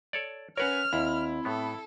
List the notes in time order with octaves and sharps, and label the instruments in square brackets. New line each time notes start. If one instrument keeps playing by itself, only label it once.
[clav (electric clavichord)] A4 C#5 D5
[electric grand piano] C#4 B4 C#5 [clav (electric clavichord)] A#4 F#5 [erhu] F6
[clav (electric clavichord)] D#2 [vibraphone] C4 B5 [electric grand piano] E4
[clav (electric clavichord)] A2 B3 [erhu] A4